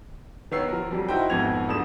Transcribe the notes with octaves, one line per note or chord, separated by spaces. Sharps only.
D#3 B3 C#5 E6 C7
F3 A#4
F2 F#3 G3
D#4 E4 F#4 C5 G5
G#1 F2 B2 F#4 G#6 F7
D1 D3 D#6 E7